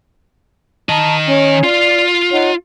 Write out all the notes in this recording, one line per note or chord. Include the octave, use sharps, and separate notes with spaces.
D#3 D#5 A5 A#5
C#4 C#5 G#5
F4 D5
D#4 C#5 F#5